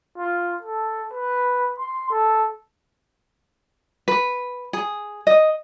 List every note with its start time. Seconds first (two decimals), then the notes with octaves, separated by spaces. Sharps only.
0.18 F4
0.62 A4
1.13 B4
1.79 C6
2.10 A4
4.08 B4
4.73 G#4
5.27 D#5